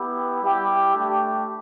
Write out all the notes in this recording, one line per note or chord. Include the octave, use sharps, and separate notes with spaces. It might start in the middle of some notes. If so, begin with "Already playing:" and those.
Already playing: B3 E4 G4
G3 E4 G4
A3 D4 G4